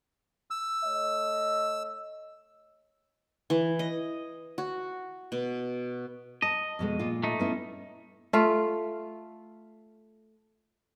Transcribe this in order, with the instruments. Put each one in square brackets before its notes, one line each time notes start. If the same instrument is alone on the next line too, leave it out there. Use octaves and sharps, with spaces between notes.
[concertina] E6
[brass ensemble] A3 C#5 D#5
[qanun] E3
D#5
F#4
B2
[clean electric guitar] D#5 [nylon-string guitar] A5
[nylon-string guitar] F2 B2 G#3
A#2 F4
[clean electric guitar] A3 D#4
[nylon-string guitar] B3 C#4 E4
[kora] A3 F4